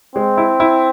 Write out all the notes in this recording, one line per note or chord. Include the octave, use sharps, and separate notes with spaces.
G#3 C4
E4
E4